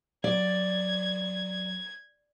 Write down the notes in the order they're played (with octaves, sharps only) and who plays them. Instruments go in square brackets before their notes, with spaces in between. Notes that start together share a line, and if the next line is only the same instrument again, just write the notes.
[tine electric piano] F#3 [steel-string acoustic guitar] D5 [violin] G#6